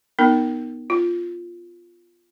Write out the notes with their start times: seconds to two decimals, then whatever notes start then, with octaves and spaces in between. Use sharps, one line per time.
0.19 B3 D#4 A#4
0.90 F4